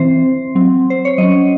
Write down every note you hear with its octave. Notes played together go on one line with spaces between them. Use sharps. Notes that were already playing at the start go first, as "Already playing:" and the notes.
Already playing: E3 C4 C5
F#3 C4
C5
C#5
F#3 C#4 D#5